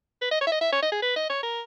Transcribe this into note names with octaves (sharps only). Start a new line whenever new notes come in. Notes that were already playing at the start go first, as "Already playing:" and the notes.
B4
D#5
C#5
E5
D#5
E5
C#5
D#5
G#4
B4
D#5
C#5
A#4